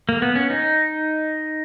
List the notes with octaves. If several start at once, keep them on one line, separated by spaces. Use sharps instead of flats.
A#3
B3
C#4
D#4